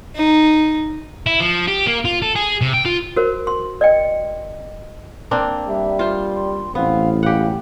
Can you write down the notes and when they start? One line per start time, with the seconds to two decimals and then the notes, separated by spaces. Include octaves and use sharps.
0.15 D#4
1.27 E4
1.40 F3
1.68 G4
1.86 A#3
2.05 F4
2.22 A4
2.36 G#4
2.61 C3
2.74 G5
2.85 F4
3.16 F#4 A#4 C5
3.47 C6
3.81 D5 D#5 G5
5.31 A#3 C4 D4
5.68 G3 E5
5.99 F4 C5
6.35 C6
6.75 A1 B3 C4 F5
7.23 C#2 G4 F5 F#5